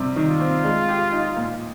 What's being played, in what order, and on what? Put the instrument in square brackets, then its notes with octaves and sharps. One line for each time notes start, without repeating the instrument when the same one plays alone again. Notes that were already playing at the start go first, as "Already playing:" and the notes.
Already playing: [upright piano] C3 G3
D#3
[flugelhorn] F4
[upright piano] C4
G#3
G4
D#4
A#2